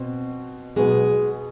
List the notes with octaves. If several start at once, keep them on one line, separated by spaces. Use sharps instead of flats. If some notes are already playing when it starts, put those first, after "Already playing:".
Already playing: B2 C4
B2 F#3 G#3 B3 G#4